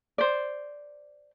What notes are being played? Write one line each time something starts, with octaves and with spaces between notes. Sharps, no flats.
C5 D5